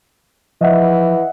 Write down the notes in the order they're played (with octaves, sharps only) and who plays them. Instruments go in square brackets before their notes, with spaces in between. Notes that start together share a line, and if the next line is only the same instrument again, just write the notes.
[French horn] E3 [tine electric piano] F3 [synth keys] D#5 E5 F#5